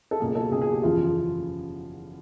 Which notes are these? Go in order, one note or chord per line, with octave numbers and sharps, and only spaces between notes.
A4
C#2 B2 F#3 A#3 G#4
A4
C#2 B2 F#3 A#3 G#4
G#4
G4
F#1 E2 C#3 F3 F4